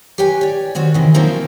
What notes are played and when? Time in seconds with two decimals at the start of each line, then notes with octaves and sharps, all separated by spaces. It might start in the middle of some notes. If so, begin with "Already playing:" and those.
0.18 G4 B4 C#5 G5 G#5
0.41 C#5 D5
0.75 D#3 C4 F#4 C#5
0.94 C3 D#3 E3
1.14 F3 F#3 A#3 C4 D#4